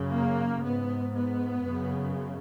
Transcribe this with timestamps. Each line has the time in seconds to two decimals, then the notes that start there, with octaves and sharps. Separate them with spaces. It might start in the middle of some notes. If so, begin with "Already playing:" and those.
Already playing: F#2 C#3
0.13 A#3
0.63 G#2 B3
1.14 B3
1.65 F#2 C#3